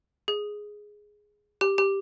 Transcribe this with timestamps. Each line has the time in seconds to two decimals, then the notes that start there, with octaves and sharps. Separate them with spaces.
0.28 G#4
1.61 G4
1.78 G4